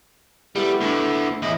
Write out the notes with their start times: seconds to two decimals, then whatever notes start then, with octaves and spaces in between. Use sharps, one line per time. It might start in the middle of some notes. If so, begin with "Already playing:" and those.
0.56 G3 A3 B3 E4
0.81 D2 D3
1.42 E2 A2 E4 D#5